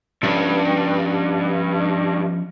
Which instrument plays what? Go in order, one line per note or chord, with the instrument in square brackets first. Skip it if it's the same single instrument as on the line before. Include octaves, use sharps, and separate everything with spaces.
[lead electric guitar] G2 [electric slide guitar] F3 C#4